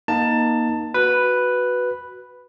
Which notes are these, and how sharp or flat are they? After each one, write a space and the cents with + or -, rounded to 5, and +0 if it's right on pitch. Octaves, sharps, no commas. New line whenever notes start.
A#3 +25 D#4 +0 A5 +15
F#4 +0 B4 +0